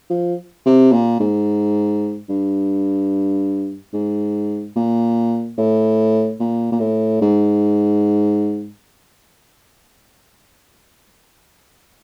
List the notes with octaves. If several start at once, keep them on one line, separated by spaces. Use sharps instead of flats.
F3
C3
A#2
G#2
G2
G#2
A#2
A2
A#2
A#2
A2
G#2